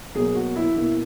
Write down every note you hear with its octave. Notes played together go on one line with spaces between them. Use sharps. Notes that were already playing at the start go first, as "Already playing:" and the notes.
B2 F#3 A#3 G#4
F#4
E4
B2 A#3 E4